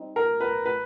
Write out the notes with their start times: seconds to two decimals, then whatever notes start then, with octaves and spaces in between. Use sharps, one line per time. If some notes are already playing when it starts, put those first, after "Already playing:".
Already playing: G3 C4 D#4
0.16 A#4
0.41 B4
0.66 B4